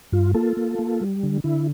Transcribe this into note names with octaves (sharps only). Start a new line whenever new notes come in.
G2 F4
A#3 F4 A4
A#3
A#3
G3
D3
D3 E4